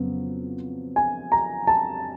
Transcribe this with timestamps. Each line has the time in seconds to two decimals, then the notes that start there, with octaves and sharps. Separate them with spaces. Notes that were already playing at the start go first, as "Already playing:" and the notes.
Already playing: F2 C#3 F#3 B3
0.96 G#5
1.32 A#5
1.67 A5